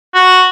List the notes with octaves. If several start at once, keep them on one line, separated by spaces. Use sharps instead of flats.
F#4